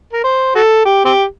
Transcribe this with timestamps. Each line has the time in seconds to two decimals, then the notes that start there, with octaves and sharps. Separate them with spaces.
0.13 A#4
0.24 C5
0.55 F#4 A4
0.85 G4
1.05 C4 G4